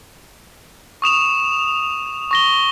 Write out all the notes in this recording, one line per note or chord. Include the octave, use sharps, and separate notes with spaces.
C#6 D#6 E7 F7
C#6 A#6 G7